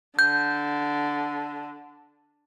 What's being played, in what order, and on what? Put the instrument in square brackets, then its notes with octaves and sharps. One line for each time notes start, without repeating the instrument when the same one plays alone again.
[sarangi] D3 [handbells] G6